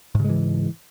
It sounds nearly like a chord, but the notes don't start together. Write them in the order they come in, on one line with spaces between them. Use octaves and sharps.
G#2 C#3 G#3 E3